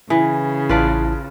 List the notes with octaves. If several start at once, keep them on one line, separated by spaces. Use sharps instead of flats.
C#3 E3
A1 E4 F4 B4 D5 A5